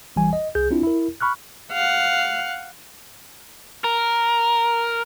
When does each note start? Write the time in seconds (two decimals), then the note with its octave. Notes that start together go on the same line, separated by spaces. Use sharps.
0.16 A1 E3 G3 G#5
0.33 D#5
0.55 C2 G#4 G6
0.71 C4 D4 E4 F4
0.83 E4 A#4
1.21 B5 C#6 F6 F#6
1.72 F5 F#5
3.84 A#4